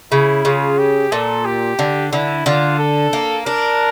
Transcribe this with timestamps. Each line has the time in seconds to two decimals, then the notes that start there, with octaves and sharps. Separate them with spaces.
0.12 C#3 E4
0.45 C#3 F4
0.79 G4
1.12 A#2 A4
1.46 G4
1.79 D3
2.13 D3 E4
2.46 D3 F4
2.79 A4
3.13 A#3
3.46 D4 A#4